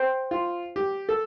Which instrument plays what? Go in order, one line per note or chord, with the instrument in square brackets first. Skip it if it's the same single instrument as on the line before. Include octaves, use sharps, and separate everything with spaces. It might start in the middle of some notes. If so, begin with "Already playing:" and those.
Already playing: [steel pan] C5 G5
[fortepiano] F4
G4
A4